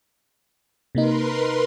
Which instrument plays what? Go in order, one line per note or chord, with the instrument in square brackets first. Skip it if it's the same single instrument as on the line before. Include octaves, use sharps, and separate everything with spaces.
[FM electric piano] C3 A#3 D#4 [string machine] A#4 B4 C6